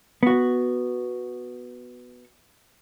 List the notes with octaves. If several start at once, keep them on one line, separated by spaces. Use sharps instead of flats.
B3 F#4